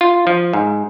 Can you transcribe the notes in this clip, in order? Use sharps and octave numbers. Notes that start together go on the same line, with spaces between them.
F4
F3
G#2